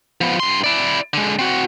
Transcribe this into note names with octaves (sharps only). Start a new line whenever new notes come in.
F3 B3
G2 C6
E4 D5
D3 G#3
C4 F#4